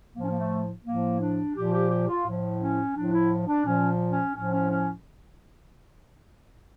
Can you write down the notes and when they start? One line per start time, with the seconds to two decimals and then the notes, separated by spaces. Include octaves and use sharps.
0.16 A2 A#3
0.18 F3 C#4
0.30 A#3
0.39 A3
0.85 A2 F3 A#3
1.20 D4
1.55 A#2 F3 G4
1.72 G4
1.90 G4
2.08 F4
2.25 A2 F3
2.61 C#4
2.95 A2 F3 D4
3.13 E4
3.47 D4
3.65 A#2 F3 C#4
4.12 C#4
4.34 A2 F3 C#4
4.52 C#4
4.70 C#4